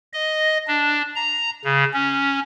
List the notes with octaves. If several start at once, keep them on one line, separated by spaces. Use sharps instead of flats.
D#5
D4
A#5
C#3
C#4